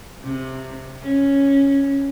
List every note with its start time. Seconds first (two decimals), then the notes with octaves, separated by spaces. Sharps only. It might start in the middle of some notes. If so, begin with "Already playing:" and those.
0.22 C3
1.01 C#4